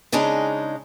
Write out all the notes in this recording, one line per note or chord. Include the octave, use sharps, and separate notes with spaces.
C#3 G#3 D4 D#4